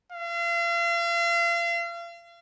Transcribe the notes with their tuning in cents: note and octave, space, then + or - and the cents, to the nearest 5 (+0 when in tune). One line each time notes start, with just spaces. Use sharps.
F5 -40